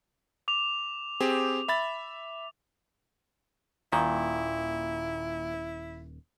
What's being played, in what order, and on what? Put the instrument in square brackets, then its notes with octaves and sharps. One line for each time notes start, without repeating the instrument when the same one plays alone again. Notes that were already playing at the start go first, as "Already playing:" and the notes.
[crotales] D6 F7
[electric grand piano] C4 G4 G#4
E5 B5 A6
[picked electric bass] D#1 [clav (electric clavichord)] A#2 D#3 [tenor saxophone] E4